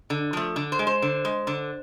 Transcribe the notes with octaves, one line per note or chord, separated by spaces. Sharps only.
D3
F3 A3
D3
C5
G#3
C5
D3
G#3
D3